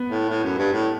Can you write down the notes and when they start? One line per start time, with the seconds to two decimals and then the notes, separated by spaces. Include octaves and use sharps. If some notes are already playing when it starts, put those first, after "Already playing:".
Already playing: B3
0.10 A2
0.29 A2
0.44 F#2
0.58 G2
0.73 A2